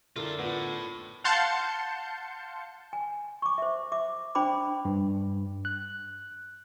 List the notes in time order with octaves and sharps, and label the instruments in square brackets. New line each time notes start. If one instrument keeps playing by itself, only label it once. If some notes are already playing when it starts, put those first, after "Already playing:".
[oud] D3 [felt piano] E4 A#4 [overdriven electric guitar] F4 A4
[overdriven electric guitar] A2 [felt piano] B3 F4
[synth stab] F5 F#5 A5 C6 G6 C#7
[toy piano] G#5
C#6 D6
C5 E5
E5 D6
D4 C5 G5 B5 D6
[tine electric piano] G2
F#6